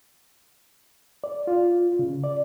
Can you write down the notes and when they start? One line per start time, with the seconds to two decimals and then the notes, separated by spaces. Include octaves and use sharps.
1.24 D5
1.47 F4
1.99 C#3
2.24 D5